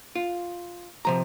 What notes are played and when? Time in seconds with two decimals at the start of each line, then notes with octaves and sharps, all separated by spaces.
0.15 F4
1.05 C3 F3 A#5